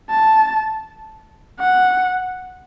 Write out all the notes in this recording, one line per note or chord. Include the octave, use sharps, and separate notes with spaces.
A5
F#5